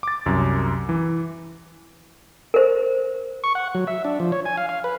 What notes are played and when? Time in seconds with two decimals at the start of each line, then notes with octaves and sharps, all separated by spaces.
0.03 D6 A6
0.26 C2 F#2
0.89 E3
2.54 A#4 C5
3.44 C#6
3.55 F#5
3.75 F#3
3.87 E5
4.04 D4
4.20 F3
4.32 C#5
4.45 G#5
4.57 F5
4.69 F5
4.84 B4